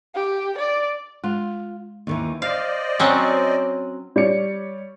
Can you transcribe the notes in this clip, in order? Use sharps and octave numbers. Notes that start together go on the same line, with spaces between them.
G4
D5
G#3 F4
D#2 D#3 E3
C5 D5 D#5 F5
F#3 C4 C#4
G3 C#5 D5 C#7